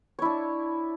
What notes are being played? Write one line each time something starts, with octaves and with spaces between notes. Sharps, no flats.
D4 E4 C#5